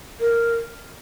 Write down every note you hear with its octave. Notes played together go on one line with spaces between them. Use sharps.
A#4